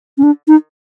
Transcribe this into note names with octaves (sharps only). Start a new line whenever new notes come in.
C#4
D4
D#4